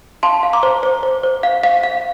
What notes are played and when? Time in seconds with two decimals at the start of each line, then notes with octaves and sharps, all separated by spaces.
0.23 F5 A5 C6
0.43 F5
0.53 A#5 D6
0.63 C5
0.83 C5
1.03 C5
1.23 C5
1.43 F5
1.63 F5
1.83 F5